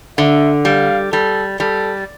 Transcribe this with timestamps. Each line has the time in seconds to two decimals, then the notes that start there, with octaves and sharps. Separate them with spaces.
0.18 D3 E5
0.65 G3 F5
1.12 G3 A4
1.60 G3 A4